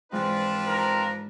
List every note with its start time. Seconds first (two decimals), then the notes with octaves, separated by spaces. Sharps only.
0.12 G#2 E3 F3 G#3 C4 D4 F4 B4
0.68 D#4 A#4